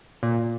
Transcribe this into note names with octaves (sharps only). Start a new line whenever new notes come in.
A#2